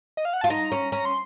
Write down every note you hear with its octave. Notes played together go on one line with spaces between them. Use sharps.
D#5
F5
F#5
F4 A5
D#4 A#5
C#4
C#4 A#5
C6